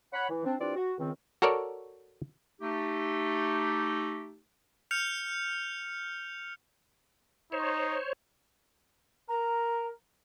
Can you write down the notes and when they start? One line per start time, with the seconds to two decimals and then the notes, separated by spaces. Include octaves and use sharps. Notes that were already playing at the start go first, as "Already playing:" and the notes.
0.13 C#5 F#5 B5
0.29 E3
0.45 C4 D4
0.58 E3 C4 D4 F4 G4 D5
0.75 F#4
0.98 C#2 D#3 C4
1.42 F#4 A4 A#4 C#5 D5
2.61 A3 D#4 G4
4.91 F6 G6 C#7 F7
7.52 D#4 C5 C#5
9.29 A#4 A#5